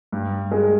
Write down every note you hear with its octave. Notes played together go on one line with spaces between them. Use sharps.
G2
G#3